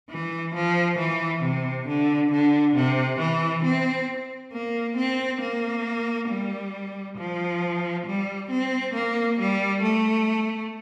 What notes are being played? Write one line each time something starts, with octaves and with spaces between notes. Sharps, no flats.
E3
F3
E3
C3
D3
D3
C3
E3
C4
A#3
C4
A#3
G3
F3
G3
C4
A#3
G3
A3